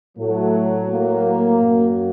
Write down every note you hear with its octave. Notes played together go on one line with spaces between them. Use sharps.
A2 F#3 A3
A#3
F#2 F#3